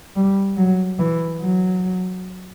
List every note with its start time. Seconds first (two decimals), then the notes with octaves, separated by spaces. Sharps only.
0.16 G3
0.57 F#3
0.99 E3
1.40 F#3